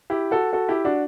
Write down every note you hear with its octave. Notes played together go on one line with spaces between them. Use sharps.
E4 G4
F#4 A4
F#4 A4
E4 G4
D4 F#4